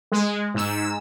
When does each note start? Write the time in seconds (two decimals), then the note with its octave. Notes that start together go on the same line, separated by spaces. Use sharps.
0.12 G#3
0.54 G#2 E6